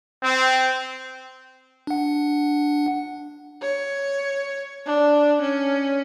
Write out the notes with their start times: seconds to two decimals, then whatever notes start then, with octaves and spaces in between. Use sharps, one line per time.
0.22 C4
1.87 D4 F#5
3.62 C#5
4.86 D4
5.42 C#4